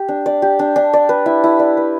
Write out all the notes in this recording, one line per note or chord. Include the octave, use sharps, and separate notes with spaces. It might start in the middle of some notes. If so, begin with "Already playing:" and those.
Already playing: G4
D4
D5
G4
D4
D4
D5
B4
E4
E4
D5
B4